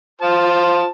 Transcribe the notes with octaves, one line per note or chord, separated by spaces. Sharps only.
F4 C5 A5